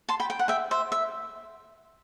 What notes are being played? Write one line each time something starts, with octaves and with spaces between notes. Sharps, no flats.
A5 C6
G5 B5
G5
F#5
E5 G5
C5 E5
E5